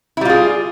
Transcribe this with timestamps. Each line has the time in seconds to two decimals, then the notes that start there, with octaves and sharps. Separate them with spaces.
0.17 E4
0.21 G3
0.25 F4
0.30 G#4